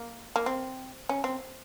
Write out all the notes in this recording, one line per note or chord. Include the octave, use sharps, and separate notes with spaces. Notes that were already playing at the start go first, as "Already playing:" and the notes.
Already playing: A#3
A#3
C4
C#4
C4